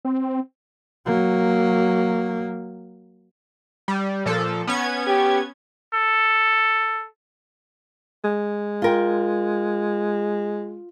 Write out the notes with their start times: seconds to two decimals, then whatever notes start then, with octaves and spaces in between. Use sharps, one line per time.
0.05 C4
1.06 F#3 A#3
3.88 G3
4.26 A#2 F3 A4
4.67 B3 C#4 G#6
5.07 G4
5.94 A4
8.24 G#3
8.82 F4 A#4 G5